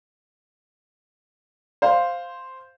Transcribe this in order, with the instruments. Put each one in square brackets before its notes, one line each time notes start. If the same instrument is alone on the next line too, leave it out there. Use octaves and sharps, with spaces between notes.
[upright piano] C5 F5